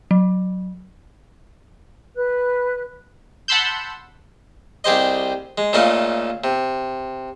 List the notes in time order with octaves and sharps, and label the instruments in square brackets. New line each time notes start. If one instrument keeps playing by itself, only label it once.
[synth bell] F#3
[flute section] B4 F#6
[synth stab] F#5 A5 B5 C6 E6 G6
[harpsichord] C2 G4 G#4 C5 D#5
G#3
A#2 C#3 A3 D#4 F5
C3